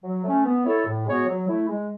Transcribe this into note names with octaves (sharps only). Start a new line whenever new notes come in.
F#3
A3 C#4
B3
E4 A4 C#5
A2
G#3 B3 F#4 C#5
F#3
A3 E4
G#3